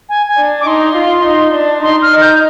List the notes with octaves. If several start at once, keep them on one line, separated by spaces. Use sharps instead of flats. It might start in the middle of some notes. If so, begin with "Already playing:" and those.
G#5
G#5
D4
D6
D#4 C6
F4
D#4
D4
D#4 C6
F6
D#4
G6